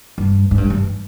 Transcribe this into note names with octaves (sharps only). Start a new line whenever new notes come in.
G2
G#2
G2
G2